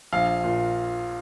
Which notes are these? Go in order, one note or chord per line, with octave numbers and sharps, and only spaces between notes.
A#1 F5
A#2